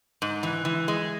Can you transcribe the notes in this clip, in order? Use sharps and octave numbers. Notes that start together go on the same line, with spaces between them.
G#2
E3
E3
G#3